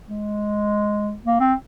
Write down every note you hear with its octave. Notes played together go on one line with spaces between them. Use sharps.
G#3
A#3
C4